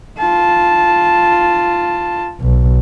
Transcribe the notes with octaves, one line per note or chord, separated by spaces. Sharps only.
F4 A5
B1